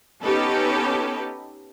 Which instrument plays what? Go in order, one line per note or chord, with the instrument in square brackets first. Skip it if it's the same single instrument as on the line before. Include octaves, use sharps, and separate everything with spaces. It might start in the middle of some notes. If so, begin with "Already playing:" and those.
[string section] B3 C#4 D#4 G4 A4 B4